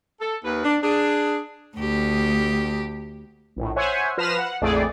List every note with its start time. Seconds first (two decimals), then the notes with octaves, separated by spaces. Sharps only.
0.21 A4
0.44 D#2 B4
0.65 D4
0.83 D4 G#4
1.77 D2 G4
3.56 A#1 A2
3.76 C5 C#5 E5 F#5 G#5
4.17 F3 B4 F6 A#6 C7 E7
4.38 F#5
4.62 A#1 F2 E3 A3 G#4 D5